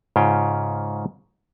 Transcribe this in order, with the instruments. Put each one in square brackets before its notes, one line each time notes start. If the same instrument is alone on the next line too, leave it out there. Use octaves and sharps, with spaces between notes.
[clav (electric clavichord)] G#2 C#3 C#4 F4 G5